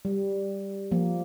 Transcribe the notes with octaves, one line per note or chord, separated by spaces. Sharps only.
G3
F3 A#3